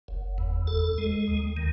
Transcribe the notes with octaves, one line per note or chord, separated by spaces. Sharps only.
F#1
E2
A4
G#3
D#2
D#3